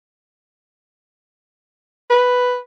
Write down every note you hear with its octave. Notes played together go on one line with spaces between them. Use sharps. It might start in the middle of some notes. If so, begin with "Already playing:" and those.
B4